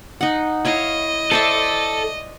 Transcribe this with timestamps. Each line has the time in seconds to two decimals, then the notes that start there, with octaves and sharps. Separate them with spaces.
0.21 D#4 F#5
0.65 E4 C#5 D#5 F5
1.31 A4 C5 D5 E5